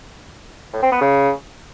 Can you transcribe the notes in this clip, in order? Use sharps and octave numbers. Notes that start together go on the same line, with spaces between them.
A2
C4
B3
C#3